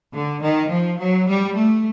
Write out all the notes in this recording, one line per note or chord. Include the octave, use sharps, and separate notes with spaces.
D3
D#3
F3
F#3
G3
A3